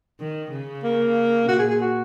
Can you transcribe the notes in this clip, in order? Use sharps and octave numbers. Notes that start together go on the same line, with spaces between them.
D#3
C#3
A#3
A#2 F#4
G#4
G#4
F#4